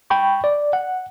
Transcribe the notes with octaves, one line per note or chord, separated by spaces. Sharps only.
G5 B5 C#6
D5
F#5